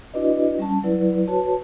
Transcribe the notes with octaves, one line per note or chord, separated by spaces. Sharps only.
D4 E4 F#4 B4 D5 D#5
G3 C#4 A5
F#3 E4 B4 D5
F#4 B4 C#5 A5